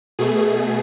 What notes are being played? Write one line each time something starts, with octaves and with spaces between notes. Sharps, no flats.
B2 A3 G#4